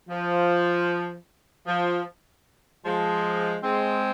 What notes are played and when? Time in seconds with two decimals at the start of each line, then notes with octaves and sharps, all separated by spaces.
0.09 F3
1.67 F3
2.85 F3 G#3
3.63 G#3 C4